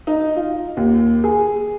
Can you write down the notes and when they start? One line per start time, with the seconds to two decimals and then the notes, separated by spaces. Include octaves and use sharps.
0.07 D#4
0.36 F4
0.77 D#2
1.24 G#4